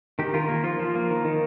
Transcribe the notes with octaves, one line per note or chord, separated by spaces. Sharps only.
D#3 G4
D#3 F4 A#4
A#3
F3 F4
F3
A#3
D#3
D#3